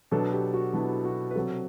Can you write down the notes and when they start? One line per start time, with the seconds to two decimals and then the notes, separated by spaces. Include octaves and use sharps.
0.11 B2 F#3 B3 D4 A4
0.33 G4
0.53 F#4
0.73 B2 F#3 B3 D4 E4
1.05 F#4
1.31 B4
1.35 C3 F#3 C4 F#4 A4